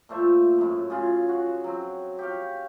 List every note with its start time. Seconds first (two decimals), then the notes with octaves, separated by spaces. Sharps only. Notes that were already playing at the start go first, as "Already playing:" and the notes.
0.09 A#2 A3 C5 E5
0.58 F#2 A2
0.90 C#3 F4 G#4
1.29 F#4
1.64 F#3 C4
2.19 G4 C#5 F5